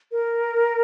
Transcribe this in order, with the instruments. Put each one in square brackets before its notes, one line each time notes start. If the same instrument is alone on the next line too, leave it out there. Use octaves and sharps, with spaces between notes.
[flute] A#4